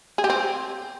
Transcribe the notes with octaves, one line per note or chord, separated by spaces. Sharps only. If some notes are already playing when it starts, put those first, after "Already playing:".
G#4
G4
C4